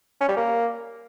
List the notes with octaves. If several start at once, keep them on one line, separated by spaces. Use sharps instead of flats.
C#4
G3
A#3